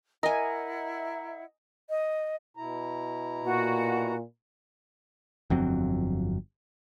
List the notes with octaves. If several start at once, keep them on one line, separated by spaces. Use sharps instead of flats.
E4 A#4 D#5 E5 F#5 G#5 A#5
D#5
B2 E4 A#5
A#2 F#4
G1 F2 F#3 C4